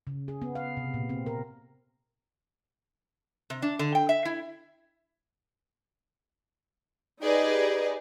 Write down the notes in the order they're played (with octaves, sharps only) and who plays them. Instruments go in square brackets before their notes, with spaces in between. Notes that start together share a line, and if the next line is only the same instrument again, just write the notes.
[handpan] C#3
G#4
B3
F5
C3
A#2
C4
A#4
[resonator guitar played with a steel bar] C3
D4
D3
G5
E5
E4
[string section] D#4 G4 G#4 B4 D5 D#5